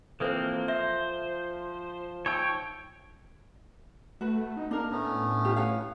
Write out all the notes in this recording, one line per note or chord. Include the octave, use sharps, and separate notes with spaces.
E3 F3 A#3 C4 A4 B4 C5
C5 E5
D#4 C#5 G5 E6
A3 F#4 B4
D#4
A#3 D4 D#4 A#4
A2 A3 B3 C#4
D4 F4 G4
B4 C#5 F5